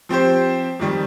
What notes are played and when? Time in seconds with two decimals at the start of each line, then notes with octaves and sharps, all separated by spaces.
0.09 F3 C4 G4 C5
0.80 F2 D#3 G3